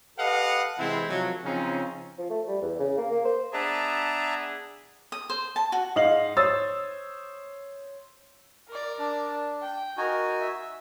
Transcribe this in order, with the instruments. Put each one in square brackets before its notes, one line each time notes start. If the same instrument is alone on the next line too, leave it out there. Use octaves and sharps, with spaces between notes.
[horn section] G4 A4 B4 D#5 F5 F#5
C3 E3 G#3 C4 E4
C3 D#3 F3 F#3
C#3 F3 C4 C#4 D#4 F4
[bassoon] F3
A3
G3
E2
C#3
A#3
A#3
C5
[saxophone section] B3 D4 G#4 [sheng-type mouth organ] E5 A5 A#5
[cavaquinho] D#6
C5
A5
F#4
[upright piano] G#2 D#5 F5 F#7
C5 C#5 D#6 E6 A6
[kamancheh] A#4 D5
[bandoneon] D4
[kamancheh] G5
[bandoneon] D#4 F#4 G#5 [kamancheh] A#4
[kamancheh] E5